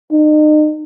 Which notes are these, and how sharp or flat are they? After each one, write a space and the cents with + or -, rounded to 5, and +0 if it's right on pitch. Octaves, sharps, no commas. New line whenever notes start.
D#4 -35